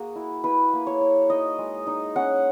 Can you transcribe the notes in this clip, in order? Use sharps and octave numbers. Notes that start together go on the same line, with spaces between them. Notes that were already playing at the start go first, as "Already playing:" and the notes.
Already playing: A#3 F#4 G#4
E4
E4 B4
A#3
C#5
E4
D#4 D#5
G#3
D#4
C#4 F#5